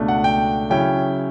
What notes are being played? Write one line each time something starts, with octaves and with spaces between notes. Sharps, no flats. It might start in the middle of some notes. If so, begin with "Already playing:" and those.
Already playing: C#2 B2 A3 D4
F#5
G5
C#3 F#3 C#4 E4 G5